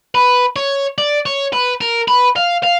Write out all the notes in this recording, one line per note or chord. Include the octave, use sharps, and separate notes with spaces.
B4
C#5
D5
C#5
B4
A#4
B4
F5
F5